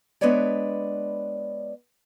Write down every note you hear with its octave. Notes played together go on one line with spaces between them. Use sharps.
G#3 B3 D4 B4 C#5 D5